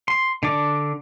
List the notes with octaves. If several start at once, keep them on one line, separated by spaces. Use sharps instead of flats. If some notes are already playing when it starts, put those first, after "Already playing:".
C6
D3 D4 D6